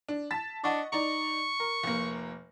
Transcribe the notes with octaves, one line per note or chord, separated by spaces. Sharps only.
D4
A5 A6 B6
D4 D#5 F#5 C#6
D#4 D5 C#6
A#4
F1 A#3